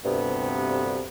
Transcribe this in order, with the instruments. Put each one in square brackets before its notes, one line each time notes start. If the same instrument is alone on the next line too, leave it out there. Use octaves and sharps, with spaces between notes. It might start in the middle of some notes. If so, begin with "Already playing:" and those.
[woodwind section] D2 G2 C3 B3